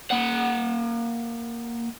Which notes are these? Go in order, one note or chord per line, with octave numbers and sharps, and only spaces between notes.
A#3 F#5